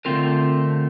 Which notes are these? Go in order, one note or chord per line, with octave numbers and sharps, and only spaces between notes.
D3 A3 C4 F4 A#4